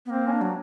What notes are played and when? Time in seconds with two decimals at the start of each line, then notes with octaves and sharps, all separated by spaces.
0.06 B3
0.10 A#3 C4
0.28 C#4
0.31 D4
0.41 F#3